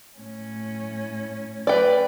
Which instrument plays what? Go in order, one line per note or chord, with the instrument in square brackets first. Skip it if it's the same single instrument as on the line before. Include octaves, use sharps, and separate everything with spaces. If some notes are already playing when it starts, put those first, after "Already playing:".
[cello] A2 C#4
[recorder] B4 [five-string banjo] D5 G5